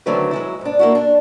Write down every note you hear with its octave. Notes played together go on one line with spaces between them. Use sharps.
D3 D#3 F#3 A3 C4 B4
F#3 G#3 E4
G#2 D4
A#3 E4 F#4
D4